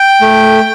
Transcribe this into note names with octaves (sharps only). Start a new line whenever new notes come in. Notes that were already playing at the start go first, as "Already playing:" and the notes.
Already playing: G5
A3